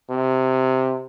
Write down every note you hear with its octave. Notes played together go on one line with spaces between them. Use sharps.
C3